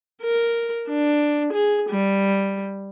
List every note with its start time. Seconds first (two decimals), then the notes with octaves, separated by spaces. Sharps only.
0.23 A#4
0.88 D4
1.53 G#4
1.90 G3